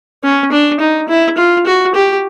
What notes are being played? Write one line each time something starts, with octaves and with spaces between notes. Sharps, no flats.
C#4
D4
D#4
E4
F4
F#4
G4